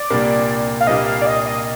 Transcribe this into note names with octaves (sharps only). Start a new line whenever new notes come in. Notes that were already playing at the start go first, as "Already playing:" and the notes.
Already playing: D5
C2 A#2 G3 A#3 D4
F5
C2 A#2 G3 A#3 D4 D#5
F5
D5
D#5
D#5